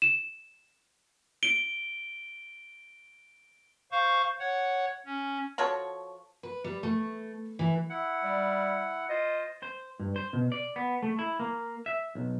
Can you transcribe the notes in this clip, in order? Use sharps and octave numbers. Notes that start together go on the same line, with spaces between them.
E7
D7 G7
C5 F5 C#6
C#5 F#5
C#4
F3 F#4 A4 C#5
B4
G3
A3
E3
E4 F#5
G3
F4 C5 D#5
C5
G2
C5
B2
D5
B3
A3
E4
A#3
E5
B1